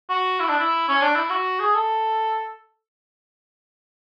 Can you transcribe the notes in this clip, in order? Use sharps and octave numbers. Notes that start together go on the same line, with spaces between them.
F#4
E4
D4
E4
C#4
D4
E4
F#4
G#4
A4